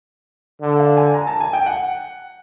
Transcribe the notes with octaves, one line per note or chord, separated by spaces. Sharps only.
D3
F5
G#5
A#5
A5
G#5
G5
F#5